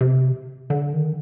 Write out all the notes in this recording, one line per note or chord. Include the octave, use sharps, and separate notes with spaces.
C3
D3
D#3